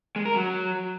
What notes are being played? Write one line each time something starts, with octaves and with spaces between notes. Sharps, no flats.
G#3
A#4
F#3